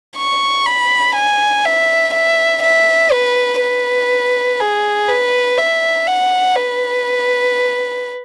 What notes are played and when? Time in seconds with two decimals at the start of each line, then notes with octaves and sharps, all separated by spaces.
0.16 C#6
0.66 B5
1.15 G#5
1.65 E5
2.14 E5
2.62 E5
3.12 B4
3.61 B4
4.60 G#4
5.09 B4
5.57 E5
6.07 F#5
6.56 B4